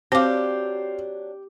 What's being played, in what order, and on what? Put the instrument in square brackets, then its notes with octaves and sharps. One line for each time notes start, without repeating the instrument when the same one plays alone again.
[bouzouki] F#3 D4 [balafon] C4 D6 [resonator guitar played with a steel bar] G4 [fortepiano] C5 F5